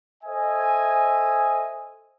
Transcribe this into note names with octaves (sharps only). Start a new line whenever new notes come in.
A4 C5 D#5 E5 G#5